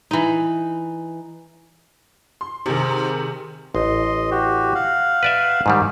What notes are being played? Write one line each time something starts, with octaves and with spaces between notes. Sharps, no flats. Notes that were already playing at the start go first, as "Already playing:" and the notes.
E3 D#4
C6
G#2 C3 D#3
A1 D#5 C6
F#4 G4
F5 F#5
B4 D5 E5
G#2 D#3 G3